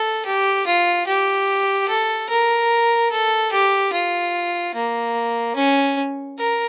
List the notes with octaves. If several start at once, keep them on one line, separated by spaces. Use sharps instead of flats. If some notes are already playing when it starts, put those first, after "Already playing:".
Already playing: A4
G4
F4
G4
A4
A#4
A4
G4
F4
A#3
C#4
A#4